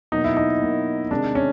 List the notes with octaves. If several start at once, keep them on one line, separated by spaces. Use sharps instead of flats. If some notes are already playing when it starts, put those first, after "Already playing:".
B2 F#3 A#3 D#4
E4
D#4
B2 F#3 A#3
C3 D#3 G#3 D4
C#4